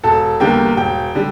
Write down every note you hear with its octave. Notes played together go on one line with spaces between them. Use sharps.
E1 A4 A5
E2 D3 G3 A#3 G5
E1 G5
D3 G3